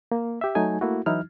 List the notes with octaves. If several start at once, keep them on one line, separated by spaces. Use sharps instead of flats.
A#3
G4 E5
F#3 A3 D#4 G#5
A3 A#3 E4 F#4
E3 F#3 D#4 E4 F6